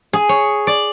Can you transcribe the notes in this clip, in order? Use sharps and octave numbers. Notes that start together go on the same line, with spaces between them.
G#4
C#5
D5